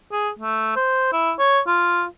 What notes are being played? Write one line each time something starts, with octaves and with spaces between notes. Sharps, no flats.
G#4
A3
C5
E4
C#5
F4